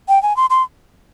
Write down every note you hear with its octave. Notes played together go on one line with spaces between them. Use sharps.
G5
G#5
C6
C6